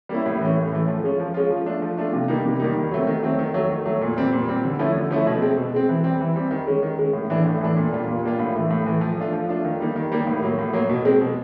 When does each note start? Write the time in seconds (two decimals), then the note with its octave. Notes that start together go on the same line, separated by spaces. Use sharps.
0.09 G3 A#3 C#4 E4
0.26 A2
0.41 E3 A3 C#4
0.57 A2
0.72 E3 A3 C#4
0.88 F3
1.04 G#3 C#4 F4
1.20 F3
1.34 G#3 C#4 F4
1.50 F3
1.66 A3 D4 F4
1.82 F3
1.98 A3 D4 F4
2.13 C3
2.28 D#3 G3 A#3 D#4
2.45 C3
2.60 D#3 G3 A#3 D#4
2.76 D#3
2.91 F#3 A3 C4
3.07 D#3
3.23 F#3 A3 C4
3.39 D#3
3.54 F#3 A3
3.70 D#3
3.86 F#3 A3
4.01 A#2
4.17 G3 C4
4.32 A#2
4.47 G3 C4
4.64 D3
4.79 F3 A3 C#4 E4
4.95 D3
5.11 F3 A3 C#4 E4
5.27 B2
5.41 G#3 C4
5.57 B2
5.74 G#3 C4
5.89 E3
6.04 G3 C4
6.21 E3
6.36 G3 C4
6.51 D#3
6.67 G#3 C#4
6.83 D#3
6.99 G#3 C#4
7.13 A2
7.30 E3 A3 D4
7.46 A2
7.61 E3 A3 D4
7.77 A#2
7.92 G3 A#3 D4 F4
8.08 A#2
8.23 G3 A#3 D4 F4
8.39 A2
8.55 E3 A3
8.71 A2
8.86 E3 A3
9.01 F3
9.17 A3 D4 F4
9.33 F3
9.49 A3 D4 F4
9.64 D#3
9.80 G3 A#3 D#4
9.96 D#3
10.12 G3 A#3 D#4
10.27 A2
10.43 F#3 A#3
10.59 A2
10.73 F#3 A#3
10.90 B2
11.05 G#3 C4
11.21 B2